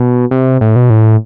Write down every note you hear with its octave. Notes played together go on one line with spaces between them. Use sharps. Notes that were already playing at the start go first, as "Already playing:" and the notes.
Already playing: B2
C3
A2
B2
A2